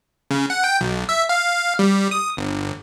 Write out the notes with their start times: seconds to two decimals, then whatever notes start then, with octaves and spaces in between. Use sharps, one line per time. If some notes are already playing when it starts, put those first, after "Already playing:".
0.31 C#3
0.50 F#5
0.64 G5
0.81 B1
1.09 E5
1.29 F5
1.79 G3
2.11 D#6
2.37 G1